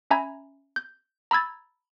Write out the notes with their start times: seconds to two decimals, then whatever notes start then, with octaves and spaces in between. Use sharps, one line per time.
0.11 C#4 E5 G#5 A#5 B5 G#6
0.76 G6
1.31 A#5 B5 E6 G#6 A6